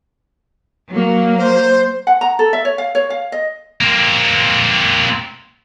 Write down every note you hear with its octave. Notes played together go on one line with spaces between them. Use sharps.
F#3 A#3
C5
F#5
A#5
A4
E5
C#5
F5
C#5
F5
D#5
A#3 C4